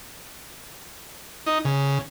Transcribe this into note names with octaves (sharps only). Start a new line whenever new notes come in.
D#4
C#3